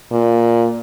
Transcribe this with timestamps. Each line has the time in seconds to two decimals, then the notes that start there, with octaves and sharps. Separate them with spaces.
0.12 A#2